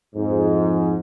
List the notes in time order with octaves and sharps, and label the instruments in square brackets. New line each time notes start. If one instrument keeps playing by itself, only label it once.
[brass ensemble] F2 G#2